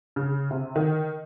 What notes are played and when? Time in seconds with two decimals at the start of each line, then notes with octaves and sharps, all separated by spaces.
0.16 C#3
0.51 C3
0.76 D#3